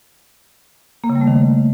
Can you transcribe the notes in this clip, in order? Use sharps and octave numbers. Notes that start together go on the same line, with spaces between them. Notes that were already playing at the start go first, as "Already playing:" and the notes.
A#3
C#3
G3
A3
D#3